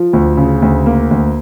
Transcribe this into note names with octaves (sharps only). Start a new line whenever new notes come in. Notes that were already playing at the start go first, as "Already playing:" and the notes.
Already playing: F3
D2
C#3
D2
A#3
D2